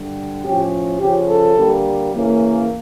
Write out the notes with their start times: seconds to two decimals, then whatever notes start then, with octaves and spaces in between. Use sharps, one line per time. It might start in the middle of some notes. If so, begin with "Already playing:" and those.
Already playing: G2 D3 G3
0.44 A2 F3 C#4 G4
1.00 C#3 F3 C#4 G4
1.27 A4
1.55 D3 G3 A#3
2.12 C#3 E3 A#3 C#4